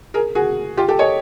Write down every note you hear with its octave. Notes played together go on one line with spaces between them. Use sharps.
G#4 A#4
F#4 G#4
F4 G4
G4 A4
C#5 D#5